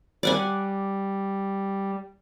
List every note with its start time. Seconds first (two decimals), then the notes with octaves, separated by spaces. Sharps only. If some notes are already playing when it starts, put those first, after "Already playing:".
0.23 G3 D5 F#5 G#5